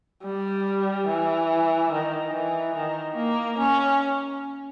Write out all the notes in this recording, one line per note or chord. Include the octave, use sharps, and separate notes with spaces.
G3
E3
D#3
E3
D#3
A#3
C#4